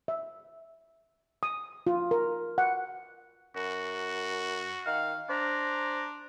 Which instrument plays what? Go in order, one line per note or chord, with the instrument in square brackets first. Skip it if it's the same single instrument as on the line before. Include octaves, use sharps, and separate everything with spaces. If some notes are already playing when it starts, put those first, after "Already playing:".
[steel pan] E5
D#6
F4
A#4
F#5
[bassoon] F#2 [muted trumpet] F#4
[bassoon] D#3 [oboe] F5
[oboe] D4 [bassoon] C5 [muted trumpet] A#5